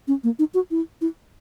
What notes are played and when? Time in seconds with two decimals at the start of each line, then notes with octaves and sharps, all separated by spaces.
0.08 C#4
0.24 A#3
0.39 D#4
0.54 F#4
0.71 E4
1.01 E4